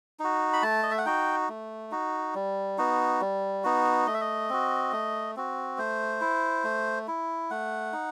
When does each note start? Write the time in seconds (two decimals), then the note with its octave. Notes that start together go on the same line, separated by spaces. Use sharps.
0.19 D#4 F#4
0.53 B5
0.63 A3 A5
0.83 D#5
0.91 E5
0.98 F#5
1.06 D#4 F#4 G5
1.49 A3
1.91 D#4 F#4
2.35 G3
2.78 B3 D#4 F#4
3.21 G3
3.64 B3 D#4 F#4
4.07 A3 D#5
4.14 E5
4.21 D#5
4.50 C4 F#4
4.92 A3
5.36 C4 F#4
5.78 A3 C5
6.21 E4
6.64 A3
7.08 E4
7.51 A3 F#5
7.93 D#4